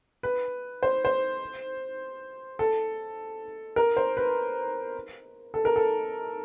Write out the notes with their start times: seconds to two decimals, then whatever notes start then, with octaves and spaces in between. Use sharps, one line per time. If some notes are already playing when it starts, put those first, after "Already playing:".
0.23 B4
0.83 C5
1.05 C5
2.59 A4
3.76 A#4
3.97 C5
4.17 B4
5.54 A4
5.65 A#4
5.76 A4